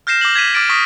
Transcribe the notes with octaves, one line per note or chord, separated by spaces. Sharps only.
F6 G6 A#6 C7 E7
D6 G6 A#6 F#7
G#6 B6 D#7
D6 F6 A6 D7
C#6 D#6 A#6 B6